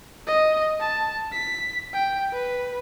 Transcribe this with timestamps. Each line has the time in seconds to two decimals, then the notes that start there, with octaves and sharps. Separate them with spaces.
0.27 D#5
0.80 A5
1.33 B6
1.94 G5
2.33 B4